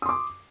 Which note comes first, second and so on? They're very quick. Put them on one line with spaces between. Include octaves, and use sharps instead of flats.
D#6 C6 D6